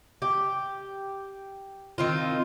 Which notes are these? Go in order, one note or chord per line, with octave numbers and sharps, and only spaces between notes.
G4
D#3 C4 F4